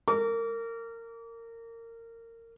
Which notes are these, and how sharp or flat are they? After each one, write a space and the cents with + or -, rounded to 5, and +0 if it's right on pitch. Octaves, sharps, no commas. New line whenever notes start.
A#4 -25 D6 -35